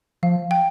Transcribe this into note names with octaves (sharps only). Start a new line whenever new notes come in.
F3 F5
G5